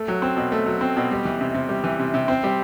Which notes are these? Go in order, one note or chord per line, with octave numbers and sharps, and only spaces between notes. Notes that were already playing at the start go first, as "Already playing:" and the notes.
Already playing: A3
F#3
C4
B2
A3
F#3
C4
B2
G3
E3
C3
C3
G3
E3
C3
C3
C4
G3